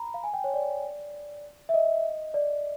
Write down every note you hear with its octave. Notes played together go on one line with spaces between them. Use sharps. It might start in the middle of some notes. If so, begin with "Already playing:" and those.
Already playing: A#5 B5
F5
G#5
G5
C#5
D5
E5
D#5
D5